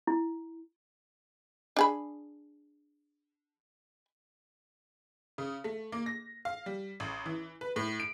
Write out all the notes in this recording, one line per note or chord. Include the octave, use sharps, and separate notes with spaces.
E4
D4 G#4 B5
C#3
A3
A#3
A#6
F5
G3
A1
E3
B4
A2
D7